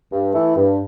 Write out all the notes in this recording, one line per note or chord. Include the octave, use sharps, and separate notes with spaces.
G2
E3 A3 E4
G2